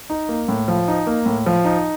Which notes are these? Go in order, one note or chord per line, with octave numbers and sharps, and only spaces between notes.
D#4
A#3
A2
F3
D#4
A#3
A2
F3
D#4